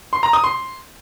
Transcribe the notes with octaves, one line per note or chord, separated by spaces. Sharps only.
C6
A#5
D#6
C6